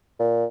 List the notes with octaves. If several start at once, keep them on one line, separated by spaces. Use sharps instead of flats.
A#2